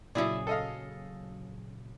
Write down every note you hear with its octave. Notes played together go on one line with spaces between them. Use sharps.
A#2 C#3 F#3 E4 G#4 D5
A4 D#5 F5